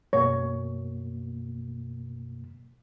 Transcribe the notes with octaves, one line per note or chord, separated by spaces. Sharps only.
F#2 B2 A#3 C#5